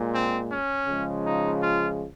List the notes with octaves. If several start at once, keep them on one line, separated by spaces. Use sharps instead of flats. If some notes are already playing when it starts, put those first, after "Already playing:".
Already playing: A#2 G#3
C4
C#4
C#3 F3 G#3
D#4
F4